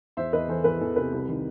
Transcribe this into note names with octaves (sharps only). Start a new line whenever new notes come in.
E2 C5 E5
E2 B4 D#5
E3 A4 C5
E2 B4
E2 A4
C3 B4
C2
D#3